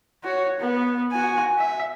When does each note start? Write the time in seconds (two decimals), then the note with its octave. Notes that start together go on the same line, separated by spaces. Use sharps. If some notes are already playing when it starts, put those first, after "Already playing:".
0.24 F#4 C#5
0.60 B3
1.12 F#4 G#5
1.59 E5